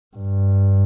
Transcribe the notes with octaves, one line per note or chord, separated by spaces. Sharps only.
G2